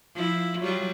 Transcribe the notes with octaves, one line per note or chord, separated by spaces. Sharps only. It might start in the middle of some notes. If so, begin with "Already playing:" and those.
F3 E4
F#3 G3 F4